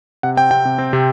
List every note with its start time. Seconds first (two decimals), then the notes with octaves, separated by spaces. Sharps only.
0.23 C3 F#5
0.37 C4 G5
0.51 C3 G5
0.65 C3
0.78 C4
0.93 C3